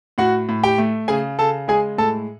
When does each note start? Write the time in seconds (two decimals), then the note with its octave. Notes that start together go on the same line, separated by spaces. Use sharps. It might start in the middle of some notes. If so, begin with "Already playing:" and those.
0.18 A2 F#4 F#5
0.49 A2
0.63 G4 G5
0.78 A3
1.08 C#3 G#4 G#5
1.38 C#3 A4 A5
1.68 G#3 G#4 G#5
1.98 A2 A4 A5